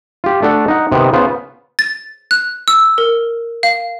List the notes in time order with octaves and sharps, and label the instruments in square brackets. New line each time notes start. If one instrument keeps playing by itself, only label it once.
[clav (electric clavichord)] F4 G4
A3 D4 A4 F#5
D#4 F#5
C3 D#3 B3
C#3 B3 F4 C5
[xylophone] A6
F#6
E6
A#4
F5